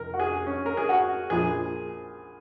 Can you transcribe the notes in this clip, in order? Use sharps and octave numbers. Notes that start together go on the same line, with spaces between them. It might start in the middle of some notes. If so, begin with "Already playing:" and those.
Already playing: F2 C3 A#4
F#4
G#4
C#4
A#4
G#4
F#4
A#1 A#2 F3 G#4